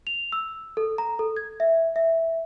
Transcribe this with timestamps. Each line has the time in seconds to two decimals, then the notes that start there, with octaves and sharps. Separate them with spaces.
0.07 F7
0.32 E6
0.77 A4
0.98 A#5
1.19 A4
1.37 G#6
1.60 E5
1.96 E5